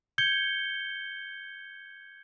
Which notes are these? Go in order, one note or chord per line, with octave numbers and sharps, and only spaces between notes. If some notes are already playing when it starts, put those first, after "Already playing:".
G6 G#6 C#7 G7